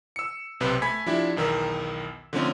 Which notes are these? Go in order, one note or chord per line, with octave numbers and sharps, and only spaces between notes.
E6 C#7
B1 C3 B4 C5
A3 G#5 B5 G#6 B6
F3 D4 E4 G4 E5
B1 E2 D#3 A#4 E6
D3 F3 A3 C4 C#4 D#4